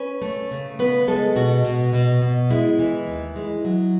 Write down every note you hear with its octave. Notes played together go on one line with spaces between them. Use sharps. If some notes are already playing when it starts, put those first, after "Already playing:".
Already playing: C#4 B4
A3
C#3
B3 B4
G#3 A4
B2 F#4
B2
B2
B2
G#3 E4
E3
D#2
G#3
F#3